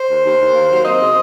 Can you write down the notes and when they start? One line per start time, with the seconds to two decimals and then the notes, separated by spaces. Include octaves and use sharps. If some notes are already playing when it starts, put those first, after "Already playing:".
Already playing: C5
0.09 D#2
0.25 D#2
0.40 D#2
0.54 A#3
0.70 F#3
0.85 C4 D#5
1.00 C#3